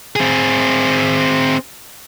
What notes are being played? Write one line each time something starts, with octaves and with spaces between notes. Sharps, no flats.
C4 G#4